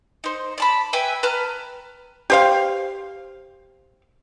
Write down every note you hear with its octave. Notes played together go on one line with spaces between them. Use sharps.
D#4 C5
D5 A5 B5
B4 E5 G5 G#5
B4 A5 A#5 F6
G4 C5 F5